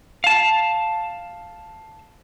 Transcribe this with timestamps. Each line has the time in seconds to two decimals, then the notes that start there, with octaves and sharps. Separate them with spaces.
0.24 F5 A5